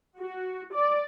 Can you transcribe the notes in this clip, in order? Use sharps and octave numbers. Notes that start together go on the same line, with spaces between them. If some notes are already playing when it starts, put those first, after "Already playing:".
F#4
D5